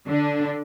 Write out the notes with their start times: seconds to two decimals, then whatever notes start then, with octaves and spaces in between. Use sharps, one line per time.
0.08 D3 D4